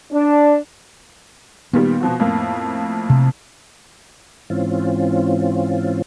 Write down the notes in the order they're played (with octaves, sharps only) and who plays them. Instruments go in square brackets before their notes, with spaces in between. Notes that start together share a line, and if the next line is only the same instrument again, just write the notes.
[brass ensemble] D4
[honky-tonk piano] A#2 D#3 G3 [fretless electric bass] B3
[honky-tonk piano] B2 F3 F#4
F2 A2 A#3
[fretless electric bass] C3
[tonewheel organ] G#2 E3 C4 C#4 F4